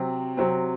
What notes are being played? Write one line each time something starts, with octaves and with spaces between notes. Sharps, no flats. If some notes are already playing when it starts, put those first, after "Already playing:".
Already playing: C3 F#3 C4
C3 F#3 C4